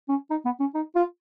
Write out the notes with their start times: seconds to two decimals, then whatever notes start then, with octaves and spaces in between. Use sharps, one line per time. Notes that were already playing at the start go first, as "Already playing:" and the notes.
0.08 C#4
0.30 D#4
0.45 B3
0.60 C#4
0.74 D#4
0.95 F4